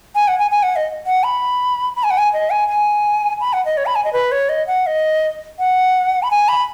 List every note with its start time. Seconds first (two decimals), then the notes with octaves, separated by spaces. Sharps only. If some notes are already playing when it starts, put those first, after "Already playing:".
0.15 G#5
0.28 F#5
0.39 G#5
0.51 G#5
0.63 F#5
0.76 D#5
1.06 F#5
1.24 B5
1.96 B5
2.03 G#5
2.10 F#5
2.18 G#5
2.33 D#5
2.50 G#5
2.68 G#5
3.40 B5
3.53 F#5
3.65 D#5
3.77 C#5
3.86 B5
3.95 G#5
4.04 D#5
4.13 B4
4.32 C#5
4.49 D#5
4.67 F#5
4.86 D#5
5.59 F#5
6.23 B5
6.31 G#5
6.48 B5